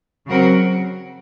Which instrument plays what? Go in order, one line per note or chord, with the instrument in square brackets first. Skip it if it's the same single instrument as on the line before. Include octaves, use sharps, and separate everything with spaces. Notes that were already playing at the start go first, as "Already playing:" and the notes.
[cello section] C#3 F#3 C4 F#4 A#4